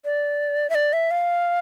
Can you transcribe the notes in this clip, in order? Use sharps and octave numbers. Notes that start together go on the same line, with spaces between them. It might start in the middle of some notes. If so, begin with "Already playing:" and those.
D5
E5
D5
E5
F5